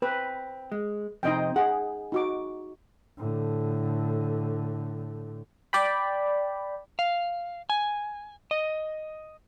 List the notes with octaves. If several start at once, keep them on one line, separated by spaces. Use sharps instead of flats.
C4 B4
G#3
F2 C3 C4 D#4 D#5 G5
G#4 F#5
D#4 F#4 D6
A2 D3
D5 G5 B5
F5
G#5
D#5